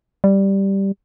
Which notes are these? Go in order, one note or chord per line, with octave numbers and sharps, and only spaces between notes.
G3